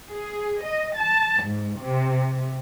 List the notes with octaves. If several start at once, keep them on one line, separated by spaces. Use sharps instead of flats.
G#4
D#5
A5
G#2
C3